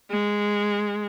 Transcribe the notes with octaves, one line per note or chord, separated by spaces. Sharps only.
G#3